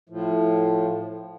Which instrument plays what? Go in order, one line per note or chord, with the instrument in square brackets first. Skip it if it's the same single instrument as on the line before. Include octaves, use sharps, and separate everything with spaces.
[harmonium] A2 F3